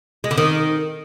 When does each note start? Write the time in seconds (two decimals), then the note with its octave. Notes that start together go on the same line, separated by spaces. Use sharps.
0.24 G#3
0.31 D3
0.38 D#3